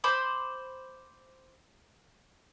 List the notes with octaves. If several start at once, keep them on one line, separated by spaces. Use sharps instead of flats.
C5 B5 C6 D6